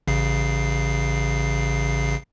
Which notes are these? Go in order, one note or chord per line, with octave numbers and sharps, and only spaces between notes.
A1 C#3 C7